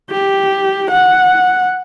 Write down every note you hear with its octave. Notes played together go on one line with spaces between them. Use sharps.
G4
F#5